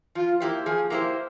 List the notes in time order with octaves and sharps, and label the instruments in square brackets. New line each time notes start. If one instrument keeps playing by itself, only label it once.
[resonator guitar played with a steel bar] F3 [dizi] F4
[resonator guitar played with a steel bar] A#3 E4 G4 C5
[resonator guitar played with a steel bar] F3 [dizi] G#4
[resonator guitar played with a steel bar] A#3 E4 G4 C5